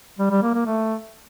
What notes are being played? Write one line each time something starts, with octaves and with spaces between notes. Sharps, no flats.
G3
G3
A#3
A#3
A3